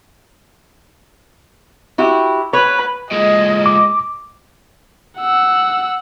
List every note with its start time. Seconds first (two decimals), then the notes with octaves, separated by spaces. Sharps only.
1.98 E4 F#4 G4
2.53 B4 C#5
3.11 A#2 G#3 D#5
3.66 D6
5.19 F#5 E6